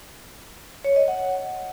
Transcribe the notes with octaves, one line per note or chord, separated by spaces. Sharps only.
C#5
D#5
F#5